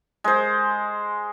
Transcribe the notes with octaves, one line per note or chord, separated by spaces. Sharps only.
G#3 C5